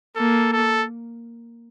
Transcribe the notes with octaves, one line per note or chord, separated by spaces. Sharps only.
A#3 A4
A4